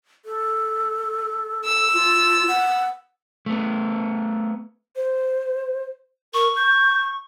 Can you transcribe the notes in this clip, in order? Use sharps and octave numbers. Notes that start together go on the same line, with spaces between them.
A4
E6
F4
F#5
A3 B3
C5
A#4 C#6
G6